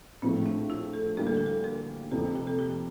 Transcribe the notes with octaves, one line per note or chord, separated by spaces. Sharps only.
A#1 A2 F3 A3 C4
D4
F4
A4
D2 D3 G3 A#3 D4 A#4
A4
G4
A4
A#4
F1 F2 C3 A4
G4
A4
G4